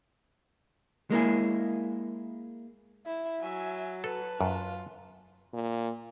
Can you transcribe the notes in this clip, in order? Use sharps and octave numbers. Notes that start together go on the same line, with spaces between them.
G#3 A#3 E4 G#4
E4
F#3 E5 G#5
A4 B4 A5
F#2 F4
A#2